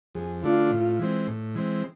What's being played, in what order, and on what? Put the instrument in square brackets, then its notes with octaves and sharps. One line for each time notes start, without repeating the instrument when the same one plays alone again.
[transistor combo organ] F2 [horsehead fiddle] G#4
[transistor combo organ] D3 A3 D4 [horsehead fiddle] F4
[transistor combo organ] A2
E3 G#3 C4
A2
E3 G#3 C4